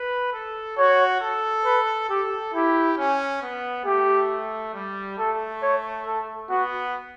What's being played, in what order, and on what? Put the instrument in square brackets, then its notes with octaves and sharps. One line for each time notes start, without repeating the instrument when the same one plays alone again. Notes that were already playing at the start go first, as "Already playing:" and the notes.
Already playing: [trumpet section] B4
A4
[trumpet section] F#4 [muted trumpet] C#5
[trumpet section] A4
[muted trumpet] B4
[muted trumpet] G4 [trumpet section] A4
[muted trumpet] E4 [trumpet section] G4
[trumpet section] C#4
B3
[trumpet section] A3 [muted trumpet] G4
[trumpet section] G3
[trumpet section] A3 [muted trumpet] A4
[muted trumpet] C#5
A4
[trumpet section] B3 [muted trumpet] F#4